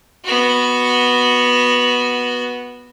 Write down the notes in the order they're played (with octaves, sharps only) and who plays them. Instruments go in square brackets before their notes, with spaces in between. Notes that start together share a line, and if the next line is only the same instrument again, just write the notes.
[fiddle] B3 F#4